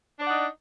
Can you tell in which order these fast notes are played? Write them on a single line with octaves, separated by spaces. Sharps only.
D4 D5 F#5 D#4